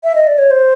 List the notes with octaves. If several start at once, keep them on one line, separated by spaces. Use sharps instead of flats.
E5
D#5
D5
C#5
C5